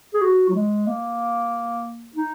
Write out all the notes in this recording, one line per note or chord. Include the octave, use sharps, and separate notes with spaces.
G#4
F#4
F#3
G#3
A#3
D#4